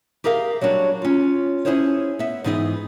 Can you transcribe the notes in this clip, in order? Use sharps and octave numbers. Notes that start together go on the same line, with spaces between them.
G4 G#4 A#4 E5 F5
F#3 G3 D4 F#4 C#5
C#4 F4
C#4 D4 E4 G#4 C5 C#5
B3 E5
G#2 E3 B3 D#4 F4 G#4